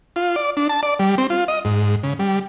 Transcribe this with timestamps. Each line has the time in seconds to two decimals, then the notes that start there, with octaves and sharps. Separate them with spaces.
0.16 F4
0.36 D5
0.57 D4
0.69 A5
0.83 D5
0.99 G3
1.18 C4
1.30 F4
1.48 D#5
1.65 G#2
2.03 C#3
2.19 G3